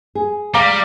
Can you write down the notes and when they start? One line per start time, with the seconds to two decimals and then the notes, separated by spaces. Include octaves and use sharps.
0.15 G#4
0.54 G3 F5 A#5 D6